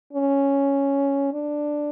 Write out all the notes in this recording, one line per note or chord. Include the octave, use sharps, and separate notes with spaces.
C#4
D4